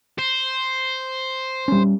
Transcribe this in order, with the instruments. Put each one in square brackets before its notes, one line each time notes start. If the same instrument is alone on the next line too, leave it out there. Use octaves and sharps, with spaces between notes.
[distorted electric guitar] C5
[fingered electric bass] G3 C#4